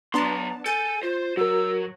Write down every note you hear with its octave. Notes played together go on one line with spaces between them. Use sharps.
F#3 B3 D4 A5 A#5 C6
A4 G#5 G6 A6
F4 C5
F#3 F#4 A#4 E6